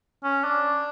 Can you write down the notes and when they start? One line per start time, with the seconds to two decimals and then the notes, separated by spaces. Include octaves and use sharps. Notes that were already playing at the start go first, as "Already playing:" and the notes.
0.24 C#4
0.44 D4